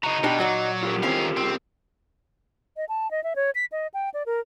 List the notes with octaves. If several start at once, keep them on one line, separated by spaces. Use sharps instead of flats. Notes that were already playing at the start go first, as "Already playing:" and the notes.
C#3 F#4 D#5 A#5
B2 D4 D#4 G4
A#2 F#3 F#4 D5
F4 G4 A#4
D#3 C4 C#4 E4 F5
C#2 C4
D#5
A5
D#5
E5
C#5
B6
D#5
G5
D5
A#4